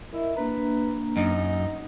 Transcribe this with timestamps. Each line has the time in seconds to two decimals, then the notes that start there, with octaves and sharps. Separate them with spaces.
0.12 E4 A#4 D#5 E5
0.37 A#3 D4 B4 A#5
1.17 F#2 D#4